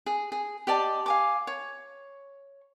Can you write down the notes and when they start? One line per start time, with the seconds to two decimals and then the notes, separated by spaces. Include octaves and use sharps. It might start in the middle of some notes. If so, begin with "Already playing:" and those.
0.06 G#4
0.32 G#4
0.67 G4 D5 D#5 A5
1.06 F5 G#5 D6
1.47 C#5